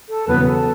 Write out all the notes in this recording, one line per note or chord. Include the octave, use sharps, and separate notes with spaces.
A4
E2 C#3 F#3 B3 B4
A4